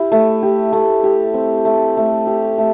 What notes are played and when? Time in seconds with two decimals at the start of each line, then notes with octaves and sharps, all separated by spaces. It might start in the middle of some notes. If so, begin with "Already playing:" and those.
Already playing: E4 G4
0.12 A3
0.43 G4
0.73 A3
1.04 G4
1.34 C4
1.65 A3
1.97 A3
2.27 G4
2.58 A3